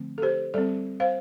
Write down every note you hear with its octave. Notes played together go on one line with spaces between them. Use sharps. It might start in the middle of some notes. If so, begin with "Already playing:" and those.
Already playing: D3 F3 A3 C4
A4
G4 C5
G3 C4 A4 D5
C5 F5